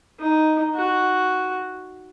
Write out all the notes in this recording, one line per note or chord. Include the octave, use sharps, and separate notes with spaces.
D#4
F#4